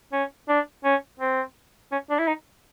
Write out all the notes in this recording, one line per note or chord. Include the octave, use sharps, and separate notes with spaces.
C#4
D4
C#4
C4
C#4
D4
E4
D#4